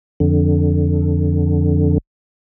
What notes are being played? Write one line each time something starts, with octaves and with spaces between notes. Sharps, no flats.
F2 D3